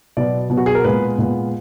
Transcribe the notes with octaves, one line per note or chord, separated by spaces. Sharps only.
B2 F#3 B3 D5
B2 F#3 B3
F#4
G#4
A#4
A#2 G#3 B3 B4
A#2 G#3 B3